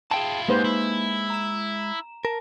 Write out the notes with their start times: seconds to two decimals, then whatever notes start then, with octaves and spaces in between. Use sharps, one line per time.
0.11 E4 F4 G#4 G5 A5
0.49 G#2 G#3 A#3 D#4 G4 B4 C5
0.65 E4
1.30 A#5 E7
2.25 A#4 A5